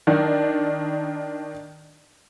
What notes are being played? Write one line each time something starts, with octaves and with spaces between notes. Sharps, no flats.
D#3 D4